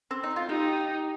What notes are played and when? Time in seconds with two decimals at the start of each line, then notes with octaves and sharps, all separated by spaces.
0.11 C4
0.23 D#4
0.36 F4
0.49 D#4 G4